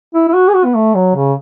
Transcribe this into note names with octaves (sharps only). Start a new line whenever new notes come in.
E4
E4
F#4
G#4
F#4
B3
A3
F#3
C#3